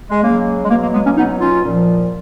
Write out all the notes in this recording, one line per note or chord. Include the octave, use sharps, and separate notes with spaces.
G#3
C#3 F#3 A#3
G#3
B2 F#3 A#3
A#3
G#3 B3
A#3 C#4
B2 F#3 B3 D#4
C#4 F4
A#2 F3